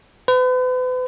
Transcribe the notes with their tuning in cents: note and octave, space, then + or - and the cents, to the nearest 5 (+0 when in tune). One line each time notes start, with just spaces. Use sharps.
B4 +40